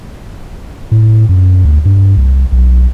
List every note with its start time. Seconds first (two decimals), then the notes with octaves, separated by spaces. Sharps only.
0.92 A2
1.29 F#2
1.65 D2
1.85 G2
2.17 C2
2.52 B1